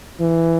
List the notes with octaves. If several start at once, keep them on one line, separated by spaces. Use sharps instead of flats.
E3